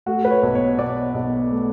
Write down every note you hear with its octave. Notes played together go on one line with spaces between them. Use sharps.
A3 F#4
B4
C#5
B1
C#5
B2 D5
B1
A3